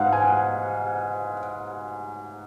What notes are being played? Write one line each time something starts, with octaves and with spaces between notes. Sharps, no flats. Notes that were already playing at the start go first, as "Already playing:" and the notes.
Already playing: G#2 F5 F#5
G#5